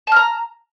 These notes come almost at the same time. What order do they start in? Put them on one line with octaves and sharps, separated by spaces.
A5 F6 A#5